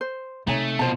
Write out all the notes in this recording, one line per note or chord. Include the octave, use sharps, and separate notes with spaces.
C5
C3 A3 C4 D#4 C#5 G#5
B2 F4 C5 A5